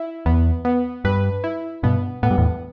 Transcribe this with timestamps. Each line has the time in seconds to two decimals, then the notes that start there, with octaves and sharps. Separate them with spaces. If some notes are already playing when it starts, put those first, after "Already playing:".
Already playing: E4
0.26 E2 B3
0.65 B3
1.05 G2 B4
1.44 E4
1.83 G2 B2 B3
2.23 A2 B3
2.30 G2
2.38 E2 A2